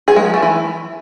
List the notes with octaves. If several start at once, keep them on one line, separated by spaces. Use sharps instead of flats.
G#4
G#3
F3
A3
E3